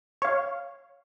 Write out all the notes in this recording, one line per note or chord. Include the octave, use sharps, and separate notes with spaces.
C#5 F5